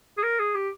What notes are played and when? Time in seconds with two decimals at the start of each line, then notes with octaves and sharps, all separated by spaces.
0.18 G#4
0.23 A#4
0.39 G#4
0.55 G4